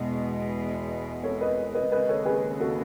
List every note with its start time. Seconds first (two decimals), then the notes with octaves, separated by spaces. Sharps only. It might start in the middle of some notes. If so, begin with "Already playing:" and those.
Already playing: E2 B2 G#3
1.24 A4 C#5
1.41 B4 D#5
1.75 B4 D#5
1.92 D#2 C#3 G#3 B4 D#5
2.09 A4 C#5
2.26 G#4 B4
2.60 F#4 A4